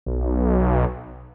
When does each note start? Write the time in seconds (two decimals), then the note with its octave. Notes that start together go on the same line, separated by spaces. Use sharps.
0.06 B1